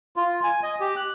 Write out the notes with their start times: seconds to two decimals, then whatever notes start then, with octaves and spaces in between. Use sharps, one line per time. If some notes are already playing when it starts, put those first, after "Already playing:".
0.16 F4
0.44 G#5
0.63 D#5
0.80 G4
0.96 F#6